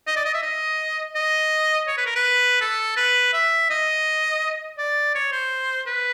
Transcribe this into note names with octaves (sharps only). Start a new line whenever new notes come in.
D#5
D5
D#5
E5
D#5
D#5
C#5
B4
A#4
B4
A4
B4
E5
D#5
D5
C#5
C5
B4